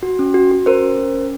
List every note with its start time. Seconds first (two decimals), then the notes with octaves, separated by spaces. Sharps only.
0.03 F#4
0.19 C#4
0.34 F#4
0.51 F#4
0.66 C#4 A#4 C5
0.82 C#4
0.98 C#4
1.14 C#4